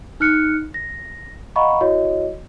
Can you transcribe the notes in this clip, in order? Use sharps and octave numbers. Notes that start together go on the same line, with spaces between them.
D#4 F6 F#6 C#7
A#6
D#5 F5 F#5 A#5 B5 C#6
E4 F#4 C#5 D#5